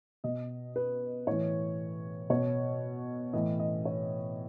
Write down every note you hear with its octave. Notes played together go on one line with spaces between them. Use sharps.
B2 D#5
B4
A2 E3 C#5
B2 C#5
A2 E3 D#5
D#5
C#5